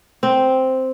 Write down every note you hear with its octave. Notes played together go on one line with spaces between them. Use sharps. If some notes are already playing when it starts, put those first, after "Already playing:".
C4